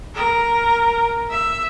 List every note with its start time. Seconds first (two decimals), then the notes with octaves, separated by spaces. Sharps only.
0.15 A#4
1.31 E5